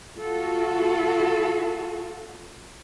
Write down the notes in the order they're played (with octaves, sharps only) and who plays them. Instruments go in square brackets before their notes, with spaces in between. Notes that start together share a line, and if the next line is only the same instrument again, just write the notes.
[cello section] F4 F#4 A4